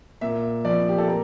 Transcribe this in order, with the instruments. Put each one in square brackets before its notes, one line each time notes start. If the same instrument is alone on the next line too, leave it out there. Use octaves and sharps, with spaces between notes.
[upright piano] A#2 E5
F3 D5
G4
A4
A#2 A#4